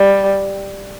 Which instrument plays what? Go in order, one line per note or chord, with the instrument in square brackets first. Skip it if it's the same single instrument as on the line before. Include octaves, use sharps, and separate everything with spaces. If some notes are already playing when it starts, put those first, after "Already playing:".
Already playing: [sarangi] G3